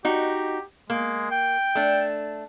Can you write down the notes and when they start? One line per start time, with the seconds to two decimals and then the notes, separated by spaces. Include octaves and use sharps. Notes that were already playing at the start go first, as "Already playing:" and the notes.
0.05 D#4 F#4 G4
0.90 G#3 A#3
1.31 G5
1.75 A3 D4